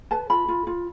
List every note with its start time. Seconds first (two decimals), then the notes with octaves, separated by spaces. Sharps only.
0.11 B4 A5
0.30 F4 B5
0.48 F4
0.67 F4